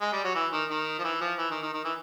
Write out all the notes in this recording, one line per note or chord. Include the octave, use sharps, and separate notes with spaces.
G#3
G3
F#3
E3
D#3
D#3
F3
E3
F3
E3
D#3
D#3
D#3
E3